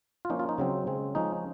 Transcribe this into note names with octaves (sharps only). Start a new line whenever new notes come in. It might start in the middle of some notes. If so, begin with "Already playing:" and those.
F4
F3 A#3 C#4 D#4
F4
D#4
C#3 F#3 C4
C#3 G#3 C4
F3 G#3 C#4 D#4